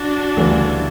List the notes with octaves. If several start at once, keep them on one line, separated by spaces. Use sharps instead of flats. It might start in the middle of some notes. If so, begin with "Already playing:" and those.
Already playing: D4 F#4
D2 C#3 E3 G3